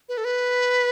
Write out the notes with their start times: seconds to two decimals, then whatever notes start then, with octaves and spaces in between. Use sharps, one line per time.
0.09 B4
0.17 A4
0.25 B4